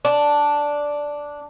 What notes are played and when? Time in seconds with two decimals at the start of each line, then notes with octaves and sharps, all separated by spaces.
0.05 D4